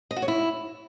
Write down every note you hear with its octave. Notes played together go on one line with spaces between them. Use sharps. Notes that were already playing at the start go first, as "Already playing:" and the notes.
D#5
F#4
C#5
E4